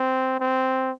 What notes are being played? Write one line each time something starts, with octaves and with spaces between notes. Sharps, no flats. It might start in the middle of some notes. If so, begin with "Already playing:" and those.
Already playing: C4
C4